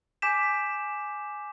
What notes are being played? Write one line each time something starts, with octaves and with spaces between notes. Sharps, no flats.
G#5 D6 G6 B6 E7